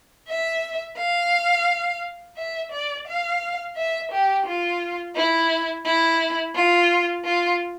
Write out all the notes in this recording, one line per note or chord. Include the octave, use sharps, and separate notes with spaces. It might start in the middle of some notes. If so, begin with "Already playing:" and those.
E5
F5
E5
D5
F5
E5
G4
F4
E4
E4
F4
F4